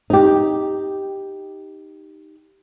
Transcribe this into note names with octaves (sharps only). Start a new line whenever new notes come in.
D#4 G4